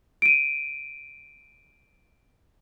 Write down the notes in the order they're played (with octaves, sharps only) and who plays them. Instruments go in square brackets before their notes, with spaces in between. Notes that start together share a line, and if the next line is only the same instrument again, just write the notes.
[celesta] D7 D#7